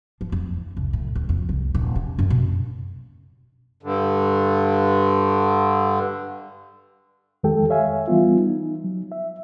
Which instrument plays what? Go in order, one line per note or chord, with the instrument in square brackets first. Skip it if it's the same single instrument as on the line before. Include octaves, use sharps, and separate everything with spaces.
[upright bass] F3
F2
E3
C2
A2
D2
F2
C2
D#1
C#4
F#2
B2
[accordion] G2 D3
[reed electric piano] F2 D#3 G#3 G4 A4 G5
C#5 E5 F5 G#5
E3 G3 B3 F4
D#4
F#3
E5